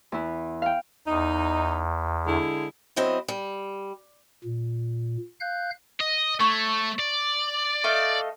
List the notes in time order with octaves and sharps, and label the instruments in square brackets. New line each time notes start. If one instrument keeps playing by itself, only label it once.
[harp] E2 E4
F5 G5
[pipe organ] E2 [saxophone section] D#4
[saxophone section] D3 G#3 E4
[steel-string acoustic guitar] F#3 C4 E4 C5 D#5
G3
[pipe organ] A#2
F5 F#6 G6
[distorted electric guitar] D#5
[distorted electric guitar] A3 [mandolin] C#5
[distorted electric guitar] D5
[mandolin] A3 D#5 F5